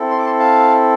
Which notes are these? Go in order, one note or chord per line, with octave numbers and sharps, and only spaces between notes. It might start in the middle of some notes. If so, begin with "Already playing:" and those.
Already playing: C4 E4 A4
C6
D6
A5 C6
F5 A5